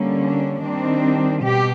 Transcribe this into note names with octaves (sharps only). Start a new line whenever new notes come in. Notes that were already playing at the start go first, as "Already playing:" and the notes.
Already playing: D3 G3 A#3 C#4
D4
D#3 G3 C4 D4
B2 G4